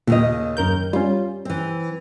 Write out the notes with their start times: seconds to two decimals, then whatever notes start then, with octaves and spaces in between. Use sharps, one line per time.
0.07 D#2 A#2 C#3 D#5
0.57 F#2 A#4 G6
0.93 G3 C#4 F4
1.45 E3 C4